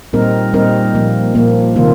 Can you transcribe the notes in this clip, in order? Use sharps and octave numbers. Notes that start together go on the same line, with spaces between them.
A#2 G3 C4 D#4 A#4
A#2 G3 C4 D#4 A#4
A#2 F3 A#3
A#2 F3 A#3
C3 D#3 A#3 F4